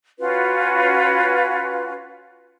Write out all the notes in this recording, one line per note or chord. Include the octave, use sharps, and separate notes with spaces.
C#4 F4 F#4 B4